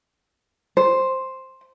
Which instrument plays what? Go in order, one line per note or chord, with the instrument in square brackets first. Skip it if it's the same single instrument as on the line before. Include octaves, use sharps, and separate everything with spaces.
[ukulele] C5